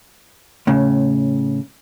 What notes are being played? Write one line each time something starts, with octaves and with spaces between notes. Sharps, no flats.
A2 C#3